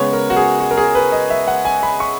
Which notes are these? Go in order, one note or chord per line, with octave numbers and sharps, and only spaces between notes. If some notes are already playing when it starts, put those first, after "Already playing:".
Already playing: C#3 G#3 B3 C#5
A#4
F#4
G#4
F#4
A#4
G#4
B4
D#5
E5
F#5
G#5
B5
C#6